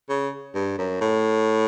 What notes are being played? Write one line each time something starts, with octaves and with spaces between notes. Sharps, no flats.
C#3
G2
F#2
A2